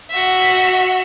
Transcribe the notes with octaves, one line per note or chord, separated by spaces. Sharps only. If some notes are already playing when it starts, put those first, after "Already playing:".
F#4 E5